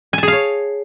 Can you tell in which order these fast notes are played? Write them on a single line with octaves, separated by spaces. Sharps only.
G#5 A5 G#4 F5 C#5